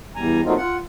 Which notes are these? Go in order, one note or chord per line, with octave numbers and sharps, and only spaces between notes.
E2 G3 G#5 A#5
F#3 A3 A#3 C4 D#4 F4
F4 F#5